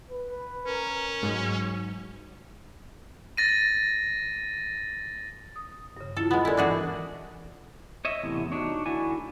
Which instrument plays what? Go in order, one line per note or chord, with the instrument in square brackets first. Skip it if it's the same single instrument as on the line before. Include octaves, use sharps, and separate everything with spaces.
[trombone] B4
[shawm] C#4 [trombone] A#4
[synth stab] G#2 [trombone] F#3
[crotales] A6 A#6 D#7
[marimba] D#6
G2 C#3
[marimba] E4 F4 [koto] A4
[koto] G#3 B3
[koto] G#3 E4 [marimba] A4 A#4 D5
[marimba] E3 [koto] D4 F#4 G#4
[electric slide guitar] C#5 D#5 E5
E2 A2 C3
D4 D#4 F#4 C#5
D3 A3 E4 F#4 D5 G#5